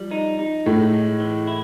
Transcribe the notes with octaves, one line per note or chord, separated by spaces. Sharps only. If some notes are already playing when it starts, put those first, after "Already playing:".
Already playing: F3 G3
D#4
D#4
A2 G#3 A3
G#3
E3
E4